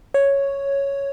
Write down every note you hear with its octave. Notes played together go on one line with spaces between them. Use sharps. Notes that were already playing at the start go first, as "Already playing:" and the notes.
C#5